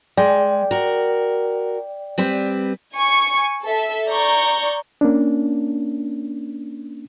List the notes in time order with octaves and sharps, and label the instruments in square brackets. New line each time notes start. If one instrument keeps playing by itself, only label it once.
[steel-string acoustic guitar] G#3 [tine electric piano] D5 G5
[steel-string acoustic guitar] F#4 A#4
G3 C4 B4
[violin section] G#5 C#6
A4 E5
D5 A#5 C#6 G6
[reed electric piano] A#3 C#4 D4